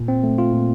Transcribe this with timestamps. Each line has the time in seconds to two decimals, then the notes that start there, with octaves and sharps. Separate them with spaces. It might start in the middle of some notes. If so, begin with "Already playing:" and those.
Already playing: A#2
0.08 C4
0.24 A3
0.38 F4
0.53 A#2